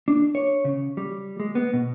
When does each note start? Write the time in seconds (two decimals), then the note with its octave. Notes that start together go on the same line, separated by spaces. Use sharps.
0.08 D4
0.35 C#5
0.65 C#3
0.97 G3
1.40 G#3
1.55 B3
1.73 B2